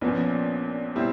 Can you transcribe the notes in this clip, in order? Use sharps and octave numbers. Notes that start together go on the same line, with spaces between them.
A#1 A#2 F3 B3 C#4
B2 G3 C4 E4